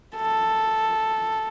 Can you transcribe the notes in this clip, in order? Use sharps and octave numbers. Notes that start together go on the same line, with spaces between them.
A4